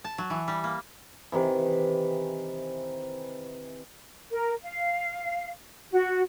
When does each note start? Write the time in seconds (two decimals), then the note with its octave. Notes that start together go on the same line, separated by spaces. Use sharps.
0.04 A5
0.18 F#3
0.30 E3
0.48 G3
0.64 A#3
1.32 C3 D#3 E3
4.31 A#4
4.63 F5
5.92 F#4